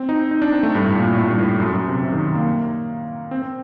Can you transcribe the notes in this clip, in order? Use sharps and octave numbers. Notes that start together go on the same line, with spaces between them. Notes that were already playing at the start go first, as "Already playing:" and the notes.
Already playing: C4
D#4
D#4
D4
C4
A3
G2
A2
A#2
A2
G2
A2
F#2
F#2
C3
C3
D#3
A#3
C4
C4